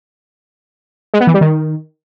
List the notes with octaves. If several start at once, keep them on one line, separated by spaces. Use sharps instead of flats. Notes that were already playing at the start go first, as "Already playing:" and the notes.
G#3
B3
E3
G3
D#3